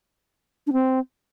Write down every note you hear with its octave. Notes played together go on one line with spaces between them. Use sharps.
D4
C4